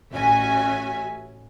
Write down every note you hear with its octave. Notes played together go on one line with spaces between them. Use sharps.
A1 C#4 F#4 E5 G#5